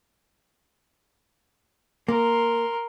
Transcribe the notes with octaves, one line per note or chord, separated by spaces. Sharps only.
A#3 A#4 C6